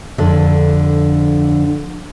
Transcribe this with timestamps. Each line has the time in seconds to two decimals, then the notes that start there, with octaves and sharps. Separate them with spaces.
0.18 F2 D3